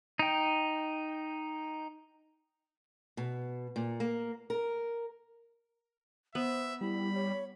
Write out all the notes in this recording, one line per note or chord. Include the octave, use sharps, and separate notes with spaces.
D#4 G5
B2
A#2
A#3
A#4
B3 C5 E5
G3 E4 B5
C#5